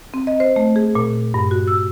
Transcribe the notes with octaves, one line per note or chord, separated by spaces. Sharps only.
C4
D#5
C5
A3
G#4
A#2
G2
F#4
E6